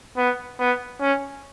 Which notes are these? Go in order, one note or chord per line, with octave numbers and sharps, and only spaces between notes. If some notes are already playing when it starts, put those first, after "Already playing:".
B3
B3
C#4